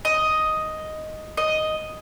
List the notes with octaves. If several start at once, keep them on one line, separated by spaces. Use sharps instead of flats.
D#5
D#5